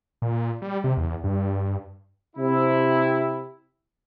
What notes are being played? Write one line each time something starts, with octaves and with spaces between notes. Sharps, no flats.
A#2
G3
C3
E2
G2
C3 E4